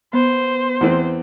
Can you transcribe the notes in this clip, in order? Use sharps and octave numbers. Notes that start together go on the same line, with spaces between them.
B3 C5
E2 E3 C4